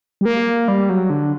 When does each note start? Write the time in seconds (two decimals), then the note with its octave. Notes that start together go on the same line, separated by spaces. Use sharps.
0.21 G3
0.25 A#3
0.68 G3
0.89 F#3
1.10 D3